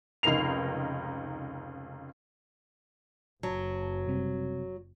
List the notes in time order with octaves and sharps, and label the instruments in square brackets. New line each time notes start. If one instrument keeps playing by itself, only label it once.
[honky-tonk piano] F1 C#2 D#4 A#4 C7 F7
[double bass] F#1 [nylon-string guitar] F#3 [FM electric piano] A5
[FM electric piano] C3 G3 C4